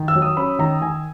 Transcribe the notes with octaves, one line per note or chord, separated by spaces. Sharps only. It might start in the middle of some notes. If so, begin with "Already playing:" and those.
Already playing: D#3
E6
F#3
D#6
C#4 B5
D#3 A#5
D#3 G#5